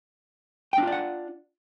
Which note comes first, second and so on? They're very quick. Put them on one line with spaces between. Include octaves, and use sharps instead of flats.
G5 D4 F4 D5 F#5